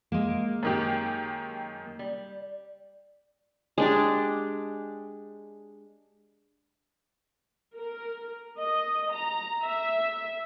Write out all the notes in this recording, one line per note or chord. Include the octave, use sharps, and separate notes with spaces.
G#3 A#3
F#2 D#3 G4
G3
G#3 D4 G4
A#4
D#5
A#5
E5